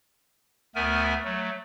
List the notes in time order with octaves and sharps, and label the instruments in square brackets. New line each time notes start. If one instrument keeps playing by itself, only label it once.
[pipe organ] D2 A3 B3 A#4 G#5
F#3 A3